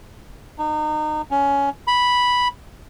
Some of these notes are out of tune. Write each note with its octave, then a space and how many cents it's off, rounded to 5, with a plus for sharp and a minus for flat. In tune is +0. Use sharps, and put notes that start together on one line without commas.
D#4 -30
C#4 +15
B5 -5